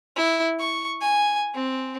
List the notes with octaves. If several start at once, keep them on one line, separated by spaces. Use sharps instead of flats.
E4
C#6
G#5
C4